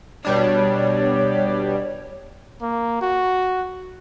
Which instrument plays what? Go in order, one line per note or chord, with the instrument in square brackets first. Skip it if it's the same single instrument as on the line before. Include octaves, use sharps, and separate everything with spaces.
[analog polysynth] B2 G3 D4 [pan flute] C#5
[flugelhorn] A#3
F#4